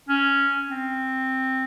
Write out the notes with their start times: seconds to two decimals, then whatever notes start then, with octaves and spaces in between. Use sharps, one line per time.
0.09 C#4
0.70 C4